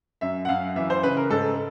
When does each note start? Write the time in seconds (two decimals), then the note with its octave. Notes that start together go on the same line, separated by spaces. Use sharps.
0.21 F#2 E5
0.45 F#5
0.49 F#2 F5
0.76 E3 E5
0.90 C5
1.03 C#3 B4
1.17 A#4
1.30 G#2 A4